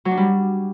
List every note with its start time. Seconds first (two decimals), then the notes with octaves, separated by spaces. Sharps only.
0.05 F#3
0.11 D4
0.17 G3